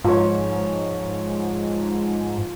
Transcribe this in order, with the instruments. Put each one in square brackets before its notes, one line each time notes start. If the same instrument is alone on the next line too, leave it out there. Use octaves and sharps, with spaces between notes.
[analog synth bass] G#2 [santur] F3 C#5